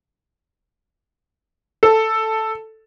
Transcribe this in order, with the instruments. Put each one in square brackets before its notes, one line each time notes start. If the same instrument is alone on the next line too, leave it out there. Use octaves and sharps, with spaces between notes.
[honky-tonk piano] A4